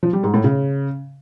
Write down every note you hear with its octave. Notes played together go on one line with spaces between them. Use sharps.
F3
G3
G#2
A2
C#3